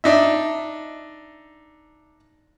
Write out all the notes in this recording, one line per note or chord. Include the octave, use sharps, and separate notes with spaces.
D4 D#4 E5